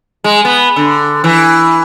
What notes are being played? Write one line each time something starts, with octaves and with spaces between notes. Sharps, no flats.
G#3
B3
D3
E3